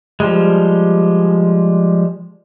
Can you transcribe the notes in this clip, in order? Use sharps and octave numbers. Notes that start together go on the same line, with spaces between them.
F3 G3 G#3